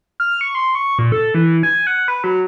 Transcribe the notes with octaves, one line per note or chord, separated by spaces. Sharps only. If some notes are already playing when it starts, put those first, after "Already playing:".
F6
C#6
C6
C#6
A#2
A4
E3
G#5
F#5
B4
F#3